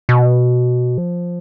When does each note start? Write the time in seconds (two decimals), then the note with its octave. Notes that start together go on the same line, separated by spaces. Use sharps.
0.09 B2
0.98 F3